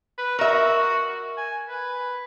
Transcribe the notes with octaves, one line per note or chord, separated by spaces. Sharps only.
B4
F#4 A#4 E5
G#5
B4